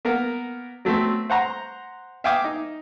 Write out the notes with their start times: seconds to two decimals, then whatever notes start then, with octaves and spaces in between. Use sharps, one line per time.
0.05 A#3 B3 A#4
0.85 F#3 A3 B3 C4
1.30 C5 F#5 A#5
2.24 E5 F5 G5 G#5 D6 D#6
2.44 D#4